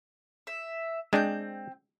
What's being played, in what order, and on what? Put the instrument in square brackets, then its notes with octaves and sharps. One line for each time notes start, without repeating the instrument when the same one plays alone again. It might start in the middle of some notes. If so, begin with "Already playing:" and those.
[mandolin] E5
[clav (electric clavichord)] G#3 D4 [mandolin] C4 G6